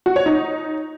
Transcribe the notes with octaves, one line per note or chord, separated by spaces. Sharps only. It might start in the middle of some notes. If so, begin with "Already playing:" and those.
F#4
C#5
D#4